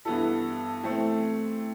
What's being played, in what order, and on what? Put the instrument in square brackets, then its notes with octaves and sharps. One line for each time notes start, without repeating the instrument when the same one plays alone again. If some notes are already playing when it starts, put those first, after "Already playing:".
[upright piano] G2 E3 B3 E4 A4
E3 A3 C4